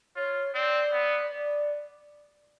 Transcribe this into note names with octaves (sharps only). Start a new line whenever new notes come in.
F4 C#5
C4 D5
B3
D5